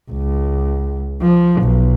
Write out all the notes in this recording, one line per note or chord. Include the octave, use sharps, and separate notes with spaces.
C#2
F3
B1